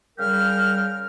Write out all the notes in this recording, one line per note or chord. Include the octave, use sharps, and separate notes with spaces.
C#3 G3 A#4 F5 G5 F6